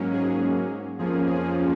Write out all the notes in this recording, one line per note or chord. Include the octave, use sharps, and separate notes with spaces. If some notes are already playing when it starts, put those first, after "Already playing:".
Already playing: G#2 F#3 A#3 C#4
G#4
F2 F3 A#3 C#4 G#4
G#4